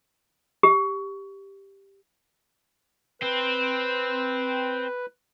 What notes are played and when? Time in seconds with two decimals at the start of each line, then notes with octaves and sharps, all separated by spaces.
0.63 G4
3.22 C4 B4